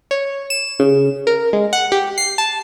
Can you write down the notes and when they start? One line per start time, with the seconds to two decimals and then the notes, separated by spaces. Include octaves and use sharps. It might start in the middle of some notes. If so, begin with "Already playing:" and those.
0.11 C#5
0.50 E7
0.80 C#3
1.27 A#4
1.53 G#3
1.73 F#5
1.92 G4
2.18 C7
2.38 A5